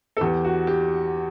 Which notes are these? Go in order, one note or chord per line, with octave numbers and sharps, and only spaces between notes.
A4
E2 G4
F#4
G4